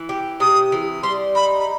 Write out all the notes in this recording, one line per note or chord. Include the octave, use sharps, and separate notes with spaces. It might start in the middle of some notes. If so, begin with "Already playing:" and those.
Already playing: E3
G4
C3 D#6
E3
G3 C6
D#4 B5
B5